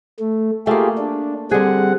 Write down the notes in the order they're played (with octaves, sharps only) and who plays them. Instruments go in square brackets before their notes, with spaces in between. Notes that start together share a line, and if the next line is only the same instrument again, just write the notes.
[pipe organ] A3
[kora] A3 A#3 [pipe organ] F4 G4 G#4
[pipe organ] D4
[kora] D3 G#4 [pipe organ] G3 C4 F#5